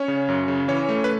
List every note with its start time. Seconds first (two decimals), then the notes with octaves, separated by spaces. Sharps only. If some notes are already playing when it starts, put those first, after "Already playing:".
Already playing: C#4 C#5
0.08 C#3
0.29 F#2
0.48 C#3
0.68 E3 C#4 C#5
0.89 A3
1.04 B4